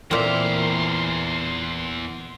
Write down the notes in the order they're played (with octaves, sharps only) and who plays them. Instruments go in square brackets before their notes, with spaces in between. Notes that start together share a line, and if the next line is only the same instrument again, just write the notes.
[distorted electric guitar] E2 A#5 [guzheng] A#2 C4 [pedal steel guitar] E3 A#4 E5 [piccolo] C6